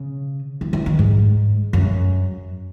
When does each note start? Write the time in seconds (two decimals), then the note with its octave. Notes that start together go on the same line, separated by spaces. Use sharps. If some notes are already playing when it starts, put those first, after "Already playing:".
Already playing: C#3
0.61 E3
0.73 E3
0.86 D#3
0.99 G#2
1.73 F#2